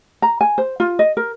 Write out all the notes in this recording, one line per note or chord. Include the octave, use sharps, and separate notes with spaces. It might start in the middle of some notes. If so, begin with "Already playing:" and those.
A#5
G#5
C5
F4
D#5
A#4